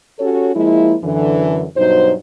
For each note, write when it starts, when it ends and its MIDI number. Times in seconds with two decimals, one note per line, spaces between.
0.20 0.50 61
0.20 0.50 66
0.20 0.50 67
0.20 0.50 69
0.20 0.50 73
0.55 0.96 53
0.55 0.96 56
0.55 0.96 58
0.55 0.96 64
1.03 1.65 42
1.03 1.65 50
1.03 1.65 52
1.76 2.13 43
1.76 2.13 47
1.76 2.13 54
1.76 2.13 63
1.76 2.13 72